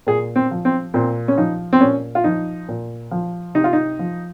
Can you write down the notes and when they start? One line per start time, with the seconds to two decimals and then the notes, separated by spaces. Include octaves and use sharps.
0.07 A#2 G#4
0.36 C4
0.51 F3
0.65 C4
0.94 A#2 C4
1.28 C#4
1.38 F3 D#4
1.73 C4
1.81 A#2 C#4
2.15 F4
2.24 F3 D#4
2.69 A#2
3.11 F3
3.55 C3 D#4
3.64 F4
3.73 D#4
3.99 F3